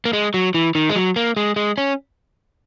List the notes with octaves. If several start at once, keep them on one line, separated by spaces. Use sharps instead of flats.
A#3
G#3
F#3
E3
D#3
G#3
F#3
A#3
G#3
G#3
C#4